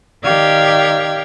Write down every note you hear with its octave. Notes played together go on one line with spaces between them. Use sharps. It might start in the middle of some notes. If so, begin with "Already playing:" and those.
D#3 G4 D5 F5 G5 G#6